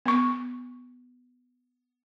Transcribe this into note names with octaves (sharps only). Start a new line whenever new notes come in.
B3 C#6